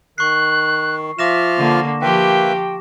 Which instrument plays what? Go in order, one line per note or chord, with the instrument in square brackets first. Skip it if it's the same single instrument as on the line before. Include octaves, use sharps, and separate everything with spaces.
[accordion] D#3 [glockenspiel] C#6 C7 [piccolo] F#6
[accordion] F3 F4 F6 [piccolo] E5 [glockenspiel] D6 A#6 E7
[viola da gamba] D3 A#3
[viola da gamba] F3 G4 [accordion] A#3 B4 E5 [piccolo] G5